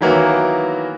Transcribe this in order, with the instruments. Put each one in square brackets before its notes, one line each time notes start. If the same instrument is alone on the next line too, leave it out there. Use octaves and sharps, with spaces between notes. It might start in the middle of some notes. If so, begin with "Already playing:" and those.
[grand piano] D#3 E3 F#3 A#3 B3 E4